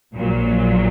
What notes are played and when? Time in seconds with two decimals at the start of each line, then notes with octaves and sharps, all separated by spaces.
0.15 A#1 A#2 F#3